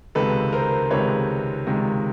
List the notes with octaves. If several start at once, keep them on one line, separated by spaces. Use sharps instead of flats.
C#2 C3 D#3 G#3 A4 B4
A#4 C5
C#2 C3 D#3 G#3 B4 C#5
C#2 C3 D#3 G#3